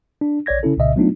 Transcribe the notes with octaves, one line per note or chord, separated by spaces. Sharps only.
D4
A#1 C#5 D5 G#6 A#6
C#3 C#4 E4 A4
C2 A#2 C#3 D#5 E5
F#3 A3 B3 D4 D#4 F4